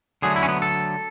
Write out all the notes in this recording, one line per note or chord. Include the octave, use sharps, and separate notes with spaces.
D3 F#3 A3 G#4
E4
C#4
B3
A4